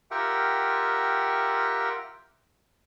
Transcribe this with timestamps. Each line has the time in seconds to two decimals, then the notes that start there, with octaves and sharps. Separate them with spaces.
0.11 F4 G4 A#4 E5 F#5 G5